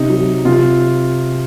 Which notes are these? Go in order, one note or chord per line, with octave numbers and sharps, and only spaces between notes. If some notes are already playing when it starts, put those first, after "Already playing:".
Already playing: C3 D#4
F#3
C3 F4